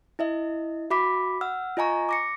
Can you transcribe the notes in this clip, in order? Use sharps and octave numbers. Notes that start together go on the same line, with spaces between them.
E4 D#5 E5
F#4 E5 B5 D6 B6
F#5 E6 F6
F4 D#5 G#5 A#5 C#6
D6 A#6 C#7